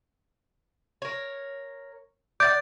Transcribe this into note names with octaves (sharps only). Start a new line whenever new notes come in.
A#4 C#5
D5 F5 F#5 D6 G6 A6